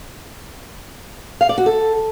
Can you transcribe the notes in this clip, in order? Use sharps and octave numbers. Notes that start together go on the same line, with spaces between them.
F5
D5
F#4
A4